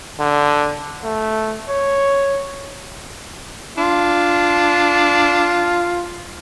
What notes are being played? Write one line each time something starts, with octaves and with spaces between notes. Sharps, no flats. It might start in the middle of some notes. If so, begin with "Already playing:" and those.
D3
A3
C#5
D4 F4